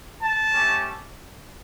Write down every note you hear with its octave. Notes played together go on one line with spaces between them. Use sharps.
A5
A3 C#4 G4